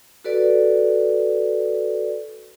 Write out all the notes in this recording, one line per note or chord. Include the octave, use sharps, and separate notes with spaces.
F#4 A4 B4 D5